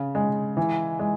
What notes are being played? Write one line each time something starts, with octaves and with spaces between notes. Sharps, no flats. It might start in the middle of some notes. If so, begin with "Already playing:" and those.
Already playing: C#3
G#3
E3
G#3